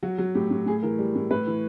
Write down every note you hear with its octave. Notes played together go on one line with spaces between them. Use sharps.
F#3 F#4
F#3
A2 G4
A2
A2 G#4
E3 A#4
G3
A2
A2 B4
E3